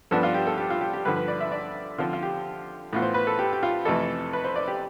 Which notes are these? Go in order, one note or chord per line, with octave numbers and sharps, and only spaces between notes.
G2 F3 B3 D4 A4
F4
G4
A4
G4
F4
G4
G4
G2 D3 F3 B4
B4
D5
E5
D5
D3 F3 C4 F4
F4
G4
A2 E3 B3 F4
C5
B4
A4
G4
G4
F4
F2 C3 E3 A3 A4
B4
C5
D5
G4